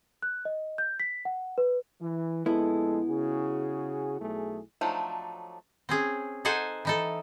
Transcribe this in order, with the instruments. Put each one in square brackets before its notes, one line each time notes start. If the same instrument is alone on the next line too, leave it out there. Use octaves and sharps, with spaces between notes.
[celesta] F#6
D#5
G6
B6
F#5
B4
[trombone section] E3
[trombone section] A#1 G#3 A4 [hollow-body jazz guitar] B3 E4
[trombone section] C#3 F#4 G#4
B1 A3 G#4
[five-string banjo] F3 F#3 A3 D4 D#4
[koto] C4 C#4 G#4
D#4 A4 C5 F#5 G#5
E3 D#4 A4